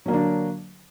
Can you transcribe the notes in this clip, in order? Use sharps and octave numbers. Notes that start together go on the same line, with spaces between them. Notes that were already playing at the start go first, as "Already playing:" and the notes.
D3 F#3 A#3 D4